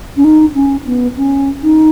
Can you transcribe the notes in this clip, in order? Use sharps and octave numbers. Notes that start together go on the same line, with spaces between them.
C#4
D#4
C#4
B3
C#4
D#4